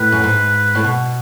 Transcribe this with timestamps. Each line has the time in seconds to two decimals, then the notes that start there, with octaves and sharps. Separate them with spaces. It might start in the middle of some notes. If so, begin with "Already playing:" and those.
Already playing: A2 B4
0.12 F#2
0.24 G#2
0.75 A2
0.84 B2